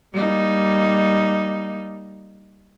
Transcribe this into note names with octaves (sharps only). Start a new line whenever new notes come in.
G3 A#3 D#4